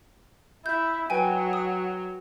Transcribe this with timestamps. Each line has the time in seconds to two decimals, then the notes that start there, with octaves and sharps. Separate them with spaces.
0.66 E4 G6
1.10 F#3 B4 G5 G#5
1.53 D#6